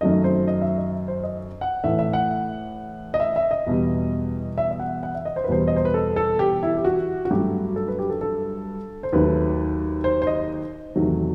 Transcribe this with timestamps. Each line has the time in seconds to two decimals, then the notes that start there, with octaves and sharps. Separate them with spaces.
0.01 F#2 D#3 F#3 A3 D#5
0.24 C5
0.47 D#5
0.61 E5
0.78 D#5
1.08 C5
1.23 D#5
1.61 F#5
1.84 A2 E3 A3 E5
1.99 E5
2.13 F#5
3.14 D#5
3.20 E5
3.36 E5
3.51 D#5
3.67 E2 B2 G3
4.58 E5
4.71 E5
4.80 F#5
5.03 F#5
5.15 E5
5.25 D#5
5.36 C5
5.44 B4
5.48 E2 B2 G3 C5
5.68 D#5
5.76 C5
5.85 B4
5.94 A4
6.16 A4
6.39 G4
6.63 E4
6.77 G4
6.85 F#4
7.25 F#4
7.31 G2 F#3 A3 G4
7.76 A4
7.88 B4
7.99 G4
8.10 A4
8.21 A4
9.03 C5
9.13 D#2 D#3 F#3 A3 B4
10.04 C5
10.22 C5
10.27 D#5
10.95 E2 C3 D#3 F#3 A3